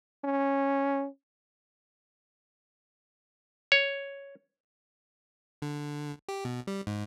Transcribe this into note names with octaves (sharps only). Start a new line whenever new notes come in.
C#4
C#5
D3
G4
B2
G3
G#2